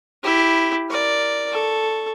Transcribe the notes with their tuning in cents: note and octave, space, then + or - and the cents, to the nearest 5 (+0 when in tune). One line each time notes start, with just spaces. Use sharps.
E4 +0 G4 +0
A#4 +0 D5 +0
A4 +0 C#6 +0